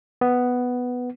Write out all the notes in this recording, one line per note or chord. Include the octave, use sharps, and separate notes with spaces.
B3